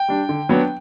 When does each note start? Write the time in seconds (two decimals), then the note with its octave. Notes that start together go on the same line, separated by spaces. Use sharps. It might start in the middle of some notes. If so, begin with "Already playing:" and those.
Already playing: G5
0.08 G3 D4
0.29 D3
0.49 F#3 B3 D4